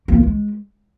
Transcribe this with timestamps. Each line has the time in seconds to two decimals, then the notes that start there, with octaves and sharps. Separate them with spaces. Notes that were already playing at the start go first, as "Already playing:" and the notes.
0.08 A#3
0.16 A2
0.23 G#3